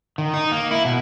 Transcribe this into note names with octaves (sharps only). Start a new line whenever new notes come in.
D#3
D#4
A#3
E4
B2